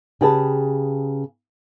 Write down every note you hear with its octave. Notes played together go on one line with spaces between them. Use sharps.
C#3 G4 G#4 B4 A5